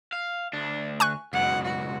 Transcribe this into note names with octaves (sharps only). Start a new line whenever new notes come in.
F5
D2 D4
G#5 C#6 F#6
C#2 F#2 B2 F#5
F#4